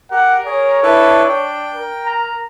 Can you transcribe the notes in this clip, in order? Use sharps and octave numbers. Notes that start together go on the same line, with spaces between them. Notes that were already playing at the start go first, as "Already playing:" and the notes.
G4 A#4 F#5
G#4 C#5
D4 E4 A4 B4
G5
A#4
A#5